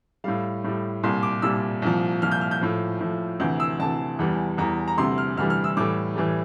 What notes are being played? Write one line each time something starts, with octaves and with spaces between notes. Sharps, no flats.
A2 G3 F5
A2 G3
C2 A#2 G3 C6
D6
C2 A#2 G3 E6
C2 A#2 F3
C2 A#2 F3 F6
G6
F6
G6
A2 F3
A2 F3
D2 C3 E3 G6
E6
D2 C3 E3 A5
E2 E3 G3
E2 E3 G3 A#5
A#5
D2 C3 E3 G3 C6
F6
D2 C3 E3 G3 F6
F6
E6
A2 E3 G3 D6
A2 E3 G3